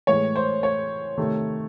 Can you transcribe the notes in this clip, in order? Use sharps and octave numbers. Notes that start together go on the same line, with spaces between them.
A2 E3 G#3 C#5
C5
C#5
C3 D#3 A3